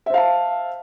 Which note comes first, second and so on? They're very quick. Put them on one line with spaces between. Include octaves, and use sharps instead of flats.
E5 C5 F5 A5